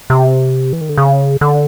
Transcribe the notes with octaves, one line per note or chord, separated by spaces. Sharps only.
C3
E3
D#3
D3
C#3
D3